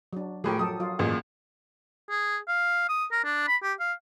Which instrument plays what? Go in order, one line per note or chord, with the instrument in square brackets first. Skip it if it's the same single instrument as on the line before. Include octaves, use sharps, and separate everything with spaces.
[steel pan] F#3 D4
[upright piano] A2 G#4 [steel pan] F3 G4 A#4
[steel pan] F#3 A4 [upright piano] D#6
[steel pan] F#3 F4
[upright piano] A1 A#2 G#4
[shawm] G#4
F5
D#6
A#4
D4
B5
G4
F5